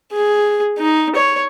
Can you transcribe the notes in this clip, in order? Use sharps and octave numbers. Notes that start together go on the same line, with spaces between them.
G#4
D#4
C#5